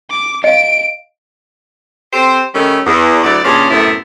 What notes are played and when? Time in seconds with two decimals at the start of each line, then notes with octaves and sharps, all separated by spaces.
0.10 D6
0.44 D#5 F5 D7
2.13 C4 G4 A4 C5
2.55 D#3 G3 A3 C#4
2.87 E2
3.24 D2 F#3 E4 D5
3.44 G2 A#2 C#3 C#4 D4 F4
3.71 F#2 A2 C3 A3 B3 E4